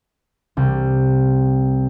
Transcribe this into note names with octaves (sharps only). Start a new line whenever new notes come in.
C2